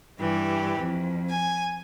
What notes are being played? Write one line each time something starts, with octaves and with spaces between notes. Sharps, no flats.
G2 E3 G4
F2
G#5